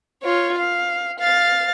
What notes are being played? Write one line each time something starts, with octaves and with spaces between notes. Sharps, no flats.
F4 C#5
F5
F5 A6